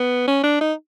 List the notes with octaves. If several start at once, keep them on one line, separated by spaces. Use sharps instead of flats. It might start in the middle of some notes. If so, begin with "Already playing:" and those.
Already playing: B3
C#4
D4
D#4